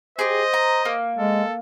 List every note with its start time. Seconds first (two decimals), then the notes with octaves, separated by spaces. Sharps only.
0.19 G4 G#4 C5 D#5
0.54 A#5
0.85 A#3
1.18 G#3 A4